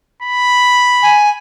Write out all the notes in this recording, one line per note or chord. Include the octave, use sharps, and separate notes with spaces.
B5
G#5